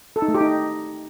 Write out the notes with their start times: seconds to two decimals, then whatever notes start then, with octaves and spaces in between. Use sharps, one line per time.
0.16 A4
0.22 D#4
0.28 A3
0.35 G4
0.41 D#4